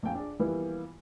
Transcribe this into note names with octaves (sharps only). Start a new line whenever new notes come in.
A#1 F2 F3 F4 G5 G#5
D4 G#4 D5
E3 F3 G3 A#3 B3 E4